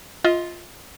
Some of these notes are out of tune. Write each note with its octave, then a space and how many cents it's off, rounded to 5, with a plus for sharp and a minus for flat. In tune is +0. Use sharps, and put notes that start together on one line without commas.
F4 +0 D#5 +30